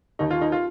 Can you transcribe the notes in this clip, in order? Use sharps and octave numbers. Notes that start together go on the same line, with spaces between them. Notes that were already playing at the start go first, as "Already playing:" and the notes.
D#2 D#4
F4
D#4
F4